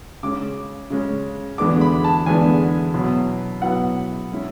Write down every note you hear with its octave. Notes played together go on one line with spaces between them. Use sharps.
C#3 G#3 C#4 D6
C#3 G#3 C#4
E2 D3 G#3 B3 D4 D6
B5
A5
E2 D3 G#3 B3 D4 G#5
B2 F#3 B3 E4
B2 F#3 B3 E4 F#5
G#3 C#4 E4